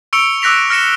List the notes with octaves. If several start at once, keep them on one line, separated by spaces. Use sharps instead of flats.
C#6 E6 C#7 D7 F7 G7
D6 E6 F#6 A#6 B6 F7
F6 A#6 C#7 E7 G7